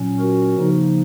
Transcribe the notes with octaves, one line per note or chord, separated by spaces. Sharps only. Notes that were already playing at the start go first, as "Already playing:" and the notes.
Already playing: A#2 F#3 C#4
F#4 A#4
C#3 F3 A#3 D#4